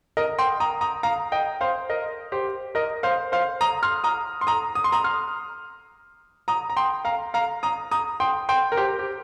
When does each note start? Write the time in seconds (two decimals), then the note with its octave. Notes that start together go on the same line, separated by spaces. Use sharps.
0.17 A#4 D#5
0.39 G5 C6
0.60 A#5 D#6
0.81 A#5 D#6
1.03 F5 A#5
1.32 D#5 G5
1.61 C5 F5
1.90 A#4 D#5
2.32 G4 C5
2.75 A#4 D#5
3.03 C5 F5
3.32 C5 F5
3.61 A#5 D#6
3.83 C6 F6
4.04 A#5 D#6
4.41 C6
4.47 A#5 D#6
4.75 D#6
4.84 C6
4.92 A#5 D#6
5.04 C6 F6
6.48 A#5 D#6
6.70 A#5
6.77 G5 C6
7.05 F5 A#5
7.34 F5 A#5
7.63 A#5 D#6
7.91 A#5 D#6
8.20 G5 C6
8.49 G5 C6
8.72 A#4
8.77 G4 C5
8.99 G4